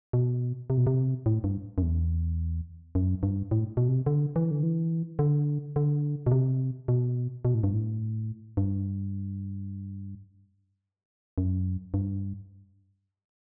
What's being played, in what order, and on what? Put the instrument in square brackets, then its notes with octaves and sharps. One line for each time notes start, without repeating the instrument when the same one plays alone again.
[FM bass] B2
C3
B2
C3
A2
G2
F#2
E2
F#2
G2
A2
B2
C3
D3
E3
D3
E3
D3
D3
B2
C3
B2
B2
A2
G2
A2
G2
F#2
G2